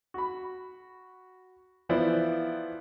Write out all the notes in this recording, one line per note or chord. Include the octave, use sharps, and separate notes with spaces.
F#4 B5
E3 F3 B3 E4 C5 D5